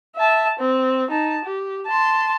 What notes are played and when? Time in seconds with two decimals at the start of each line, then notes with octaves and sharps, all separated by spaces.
0.17 E5 A5
0.59 C4
1.11 D#4 A5
1.45 G4
1.87 A5 C6